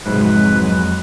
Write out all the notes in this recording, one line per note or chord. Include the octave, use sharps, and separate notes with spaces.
F2 G#2 C3 F#3 G#3 B4